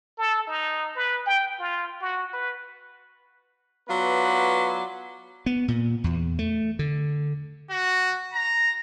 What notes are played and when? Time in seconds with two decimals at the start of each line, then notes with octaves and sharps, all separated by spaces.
0.18 A4
0.47 D#4
0.96 B4
1.26 G5
1.59 F4
2.01 F#4
2.33 B4
3.89 F#3 B3 F4 B4 D5
5.46 B3
5.68 A#2
6.04 E2
6.39 A3
6.79 D3
7.70 F#4
8.33 A#5